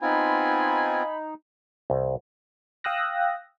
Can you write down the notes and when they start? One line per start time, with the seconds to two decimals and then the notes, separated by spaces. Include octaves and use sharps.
0.02 B3 C4 D#4 F4 G#5 B5
1.90 C2
2.84 F5 G5 D#6 E6 F#6 A#6